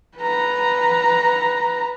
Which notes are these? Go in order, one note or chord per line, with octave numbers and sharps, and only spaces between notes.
B4 A#5